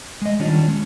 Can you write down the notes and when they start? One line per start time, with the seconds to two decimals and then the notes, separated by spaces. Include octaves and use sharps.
0.22 G#3 D#5
0.39 D#3 G3 C#4 D4 F4
0.68 G#3 C#4